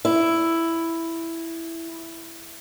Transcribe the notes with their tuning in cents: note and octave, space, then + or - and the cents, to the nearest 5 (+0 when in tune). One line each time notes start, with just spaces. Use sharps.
E4 +5